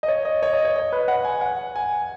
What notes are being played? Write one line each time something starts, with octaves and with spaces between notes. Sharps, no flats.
D#5
C#5
D#5
C#5
D#5
C#5
D#5
B4
F#5
G#5
F#5
G#5